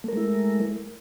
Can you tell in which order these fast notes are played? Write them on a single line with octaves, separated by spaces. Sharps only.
A3 A#4 G#3 E4